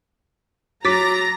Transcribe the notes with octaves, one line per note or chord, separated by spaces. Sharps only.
F#3 A#5 D6 A6 B6